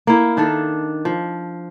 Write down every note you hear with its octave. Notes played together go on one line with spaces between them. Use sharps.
A#3 E4
D#3 D4 A4
F3